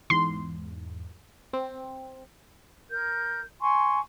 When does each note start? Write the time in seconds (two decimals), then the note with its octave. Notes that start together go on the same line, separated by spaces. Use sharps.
0.10 E2 G#2 C6
1.53 C4
2.91 A#4 G6
3.61 G#5 C6 C#6